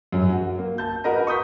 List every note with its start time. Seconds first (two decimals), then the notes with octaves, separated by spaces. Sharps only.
0.13 F#2 F#3 C#4
0.33 F#4
0.58 A#3
0.78 A5 G6
1.04 F#4 A#4 B4 D#5 A#5
1.27 C#6 D#6 G6 B6